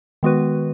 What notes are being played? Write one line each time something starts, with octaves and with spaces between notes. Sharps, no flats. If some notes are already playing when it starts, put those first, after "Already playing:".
D#3 G#3 B3 F#4 B4